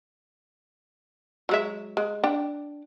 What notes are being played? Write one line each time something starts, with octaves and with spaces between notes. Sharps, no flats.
F#3 G#3 E5
G#3
D4 G5